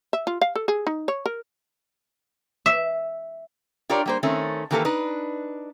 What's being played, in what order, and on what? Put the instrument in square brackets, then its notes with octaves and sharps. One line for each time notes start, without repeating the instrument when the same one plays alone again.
[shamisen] E5
F4
F5
A4
G#4
D#4
C#5
A#4
[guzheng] E5
[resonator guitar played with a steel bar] D4 F4 G4 A#4 C#5 D5
G3 A#3 C5
D#3 A3 C4 C#4
D#3 E3 A#3 G4 A4 B4
D4 D#4 B4